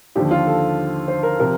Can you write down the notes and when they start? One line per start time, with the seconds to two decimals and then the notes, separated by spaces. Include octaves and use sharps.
0.15 D#2 D3 F3 G4
0.31 F4
0.47 A4
1.08 C5
1.23 A#4
1.39 C3 F3 A#4